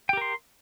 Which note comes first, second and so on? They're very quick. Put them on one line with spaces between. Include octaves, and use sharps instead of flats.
G5 G4 A#4 C6